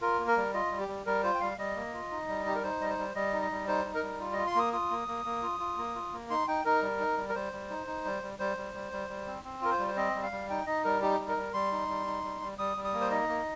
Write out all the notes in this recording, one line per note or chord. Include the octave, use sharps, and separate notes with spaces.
F4 A#4
A#3
A#4
G3
F4 D#5
G3
G4
G3
G3 A#4
F4 C5
G5
G3 F5
G3 D#5
A#3
F4
D#4
G3
D#4 G4
A#4
D#4 C5
G3 D#5
C5
G3
G3 D#5
D#4
D#5
G3
D#4 C5
D#4
A#4
G3
F4
F4 D#5
C6
A#3 D#6
F4 D#6
A#3
A#3
A#3
F4
F4
A#3
F4
A#3
D#4 C6
D#4 G5
D#4 A#4
G3
D#4
G3
A#4
G3 C5
G3
D#4
D#4
G3
G3
G3 C5
G3
G3
G3
G3
C4
C4
F4 A#4
C5
G3
C5
C4 D#5
G3
F5
G3
D#4 G5
D#4 D#5
G3 A#4
D#4 G4
G3
A#4
G3
G3 C6
D#4
G3
D#4
G3
G3
G3 D#6
G3
D#6
A#3
C5
D#4 D#5
A#3